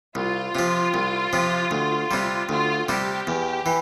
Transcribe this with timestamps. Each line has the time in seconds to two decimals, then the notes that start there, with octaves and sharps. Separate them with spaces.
0.15 C2 F4
0.55 C3 F3
0.94 C2
1.33 C3 F3
1.71 D2
2.11 C3 G3
2.49 D2 F4
2.88 C3 G3 G4
3.27 E2
3.66 E3